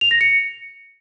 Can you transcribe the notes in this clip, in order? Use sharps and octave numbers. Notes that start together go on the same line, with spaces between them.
F7
A#6
C#7